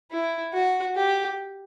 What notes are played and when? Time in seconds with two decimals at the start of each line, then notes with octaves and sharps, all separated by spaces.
0.11 E4
0.53 F#4
0.96 G4